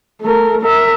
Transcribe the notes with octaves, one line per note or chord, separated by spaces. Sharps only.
A3 A#4
A#4 E5